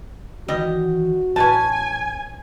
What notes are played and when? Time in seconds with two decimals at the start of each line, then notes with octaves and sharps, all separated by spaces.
0.48 D#3 E3 G3 F#4 D#5
1.36 A1 C#4 B4 G#5 A5